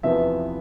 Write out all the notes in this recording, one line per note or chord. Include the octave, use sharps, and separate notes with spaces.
E2 C3 F3 B3 E5